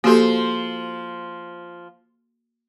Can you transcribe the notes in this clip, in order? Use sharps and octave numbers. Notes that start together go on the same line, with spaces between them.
F3 A#3 F#4 G4 A4 C5